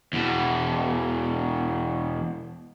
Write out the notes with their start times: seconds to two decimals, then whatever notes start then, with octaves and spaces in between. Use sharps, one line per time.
0.13 E2 B2